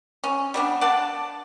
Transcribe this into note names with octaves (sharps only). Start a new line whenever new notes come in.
C#4
G3 B3 D4
D5 F#5 A5